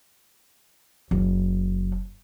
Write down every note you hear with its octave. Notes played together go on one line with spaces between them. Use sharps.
F#1